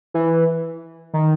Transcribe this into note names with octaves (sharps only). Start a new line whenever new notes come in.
E3
D#3